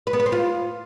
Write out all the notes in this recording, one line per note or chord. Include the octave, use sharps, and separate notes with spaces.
B4
B3
B4
C4
F4